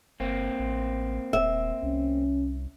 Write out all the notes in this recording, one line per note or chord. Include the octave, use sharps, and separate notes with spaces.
G1 A#3 C4
A1
D#1 E5
C2 C#4